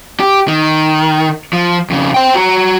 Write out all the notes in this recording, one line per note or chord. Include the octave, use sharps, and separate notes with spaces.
G4
D#3
F3
F2 C#3
C5 G5
F#4 A#5